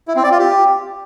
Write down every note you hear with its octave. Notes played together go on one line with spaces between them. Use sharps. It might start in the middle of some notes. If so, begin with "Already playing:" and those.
E4
C4
D5
F4
G4